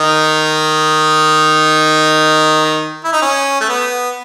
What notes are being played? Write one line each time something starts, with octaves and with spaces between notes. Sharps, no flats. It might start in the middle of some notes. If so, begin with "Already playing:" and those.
Already playing: D#3 D#4
E4
D#4
C#4
A3
B3